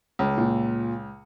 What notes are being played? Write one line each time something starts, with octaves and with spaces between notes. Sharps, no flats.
C#2
A#2